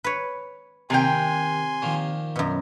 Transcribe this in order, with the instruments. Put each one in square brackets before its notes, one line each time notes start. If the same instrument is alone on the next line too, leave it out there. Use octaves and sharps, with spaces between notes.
[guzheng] B4 C#5
[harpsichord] D#2 A#4 [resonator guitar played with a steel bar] C3 G5 [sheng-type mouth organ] G#5 C6
[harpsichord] A#2 D#3 F3
[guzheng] F#2 B2